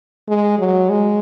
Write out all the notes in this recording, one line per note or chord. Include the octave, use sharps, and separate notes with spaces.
G#3
F#3
G#3